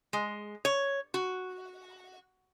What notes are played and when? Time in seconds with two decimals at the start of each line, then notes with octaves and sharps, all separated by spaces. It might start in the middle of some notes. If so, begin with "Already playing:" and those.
0.13 G#3
0.65 C#5
1.14 F#4